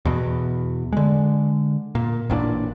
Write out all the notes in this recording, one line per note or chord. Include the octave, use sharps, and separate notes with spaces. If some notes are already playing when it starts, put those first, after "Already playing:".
E2 B2
D3 G#3
A#2
A1 A#2 D#3 D4